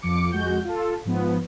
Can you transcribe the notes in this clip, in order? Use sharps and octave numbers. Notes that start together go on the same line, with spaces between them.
F2 F3 D6 C#7
F2 G#3 F#4 G6
F4 A4
G#2 F3 B3